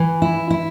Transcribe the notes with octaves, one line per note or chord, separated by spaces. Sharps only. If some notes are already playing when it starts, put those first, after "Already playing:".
Already playing: E3
E4
E4